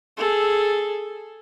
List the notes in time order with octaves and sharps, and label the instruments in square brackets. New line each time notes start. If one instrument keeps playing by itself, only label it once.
[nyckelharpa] G#4 A4